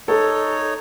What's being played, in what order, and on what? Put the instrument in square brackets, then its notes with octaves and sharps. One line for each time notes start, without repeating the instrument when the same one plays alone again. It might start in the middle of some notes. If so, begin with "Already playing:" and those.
[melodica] D#4 C#5 [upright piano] A4